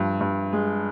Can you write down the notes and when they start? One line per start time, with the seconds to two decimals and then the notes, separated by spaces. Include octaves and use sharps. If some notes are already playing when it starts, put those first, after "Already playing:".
Already playing: G2 F3
0.21 G2
0.53 G#3